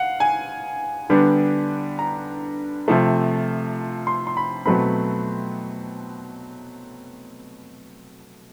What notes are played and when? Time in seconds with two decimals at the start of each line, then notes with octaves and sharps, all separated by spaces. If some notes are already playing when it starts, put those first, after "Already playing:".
Already playing: F5 F#5
0.20 G#5
1.10 D3 G3 B3 D4
1.99 A#5
2.88 C3 F3 A3
4.07 C6
4.27 C6
4.37 B5
4.66 B2 F#3 A3 C4 B5